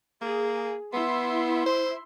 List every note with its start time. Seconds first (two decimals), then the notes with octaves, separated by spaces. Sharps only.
0.22 A#3 G#4
0.93 B3 E4 E5 C6
1.66 C5